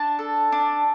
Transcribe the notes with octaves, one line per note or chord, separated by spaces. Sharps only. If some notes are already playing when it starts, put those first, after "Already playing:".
Already playing: D4 A5
A4
D4